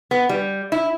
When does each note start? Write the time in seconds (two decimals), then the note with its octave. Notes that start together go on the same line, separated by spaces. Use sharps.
0.11 B3
0.29 G3
0.72 E4